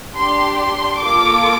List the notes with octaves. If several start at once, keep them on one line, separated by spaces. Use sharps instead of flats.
D4 G4 C6
C6
A#3 F4 A4 D6